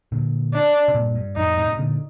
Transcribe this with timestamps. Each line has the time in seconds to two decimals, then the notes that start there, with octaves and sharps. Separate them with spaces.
0.12 A#2 D3
0.54 D4
0.88 C3
0.95 G2 A#2
1.15 G2
1.36 F2 A2 D#4
1.57 A2 C3
1.69 C3
1.78 A#2 D3